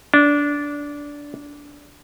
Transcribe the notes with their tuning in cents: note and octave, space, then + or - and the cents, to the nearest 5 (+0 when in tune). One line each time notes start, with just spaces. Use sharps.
D4 -15